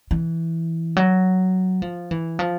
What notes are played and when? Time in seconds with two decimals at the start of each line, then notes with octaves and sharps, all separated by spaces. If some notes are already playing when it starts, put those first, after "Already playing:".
0.11 E3
0.97 F#3
1.82 F3
2.11 E3
2.39 F3